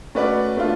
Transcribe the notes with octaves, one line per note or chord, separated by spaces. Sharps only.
A3 C#4 F#4 B4 D5
A3 D4 F4